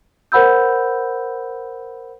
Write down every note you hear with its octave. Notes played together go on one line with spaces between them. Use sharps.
A#4 C5 F#5 B5 E6 G6